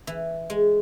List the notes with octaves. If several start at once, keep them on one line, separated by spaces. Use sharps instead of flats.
E3
G#3